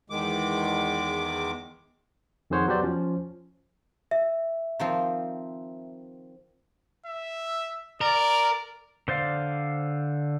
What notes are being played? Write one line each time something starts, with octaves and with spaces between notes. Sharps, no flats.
E2 D#3 G#3 D6
F2 D#3 G#4 C5 C#5 F#5
F#3 B3 G4 C5 D5
F3 C#4
E5
D#3 F3 C4
E5
A#4 D5
D3 C5 D5 F5